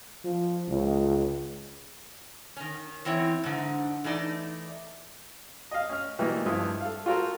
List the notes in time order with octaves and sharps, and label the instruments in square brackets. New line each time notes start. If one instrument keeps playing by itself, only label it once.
[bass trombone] F3
C#2
[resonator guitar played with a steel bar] D#3 C#4
E2 E3 C4 E4 C#5
G#2 D3 D#4
E3 A3 D#4 D5
[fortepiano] D#5 F5
C#4 F6
B1 E3 G3 A#3 D#5
G2 F3 E4 D#6
A4 F5
F4 F#4 A4 A#4 C5